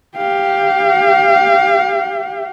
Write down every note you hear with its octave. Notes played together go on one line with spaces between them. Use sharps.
G4 F5